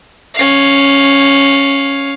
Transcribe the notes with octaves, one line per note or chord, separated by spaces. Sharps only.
C#4 F5